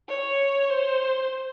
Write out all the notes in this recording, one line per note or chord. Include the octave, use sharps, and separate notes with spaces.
C#5
C5